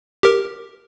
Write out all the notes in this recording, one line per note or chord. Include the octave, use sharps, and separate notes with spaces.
G4 A#4